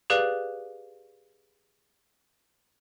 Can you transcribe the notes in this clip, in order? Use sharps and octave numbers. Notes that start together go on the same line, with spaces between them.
G4 G#4 B4 D5 F5 F#6